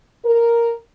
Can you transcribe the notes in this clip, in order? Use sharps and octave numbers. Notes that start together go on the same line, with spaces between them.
A#4